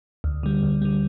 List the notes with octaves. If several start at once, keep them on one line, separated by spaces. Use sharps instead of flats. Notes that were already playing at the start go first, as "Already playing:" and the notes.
D2
D3 G3
D2
D3 G3